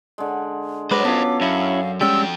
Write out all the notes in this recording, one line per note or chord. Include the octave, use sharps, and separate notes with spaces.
D3 G#3
F#3 G#3 B4 C5 D#5 D6
B3 C#4 F4 A4
F#2 C#4 E4 F#4 F5
F2 G3 G#3 C#4 G5 E6